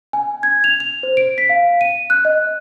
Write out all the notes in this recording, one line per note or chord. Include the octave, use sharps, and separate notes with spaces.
G#5
G#6
F7
F7
C5
D7
B6
F5
D#7
F#6
D#5